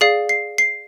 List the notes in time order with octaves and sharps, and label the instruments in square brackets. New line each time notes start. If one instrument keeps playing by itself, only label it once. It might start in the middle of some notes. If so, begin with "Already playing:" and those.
[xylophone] G#4 D5 F5 C7
C7
C7